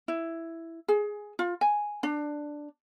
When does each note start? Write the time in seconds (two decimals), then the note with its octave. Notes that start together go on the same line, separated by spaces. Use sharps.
0.08 E4
0.88 G#4
1.39 F4
1.61 G#5
2.03 D4